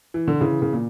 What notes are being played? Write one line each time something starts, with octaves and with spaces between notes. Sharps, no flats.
E3
D3
C#3 E3
C#3
A#2